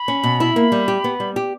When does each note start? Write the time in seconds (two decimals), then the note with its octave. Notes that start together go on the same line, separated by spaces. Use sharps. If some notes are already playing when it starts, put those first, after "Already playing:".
Already playing: B5
0.08 C#4
0.23 B2
0.40 E4
0.56 A#3
0.72 G3
0.88 G4
1.04 B3
1.20 G3
1.36 G4